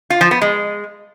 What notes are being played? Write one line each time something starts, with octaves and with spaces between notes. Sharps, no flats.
F4
F3
B3
G#3